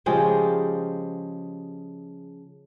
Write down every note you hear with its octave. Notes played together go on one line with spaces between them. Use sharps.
C#3 F3 G#3 G4